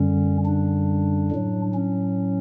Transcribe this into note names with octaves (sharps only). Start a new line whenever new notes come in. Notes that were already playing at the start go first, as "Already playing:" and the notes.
Already playing: F#2 D3 G3 C#4
D4
A2 F#3
C#4